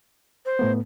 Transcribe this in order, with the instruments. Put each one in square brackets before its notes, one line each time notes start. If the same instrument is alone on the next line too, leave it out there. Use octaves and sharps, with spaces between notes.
[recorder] C5
[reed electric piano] A2 A3 B3